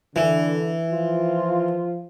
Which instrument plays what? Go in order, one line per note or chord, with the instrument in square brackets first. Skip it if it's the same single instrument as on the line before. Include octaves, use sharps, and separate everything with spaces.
[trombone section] D3 [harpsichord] E3
[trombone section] F3 F4